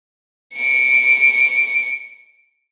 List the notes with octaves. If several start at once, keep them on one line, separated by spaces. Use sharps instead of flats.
C#7 D7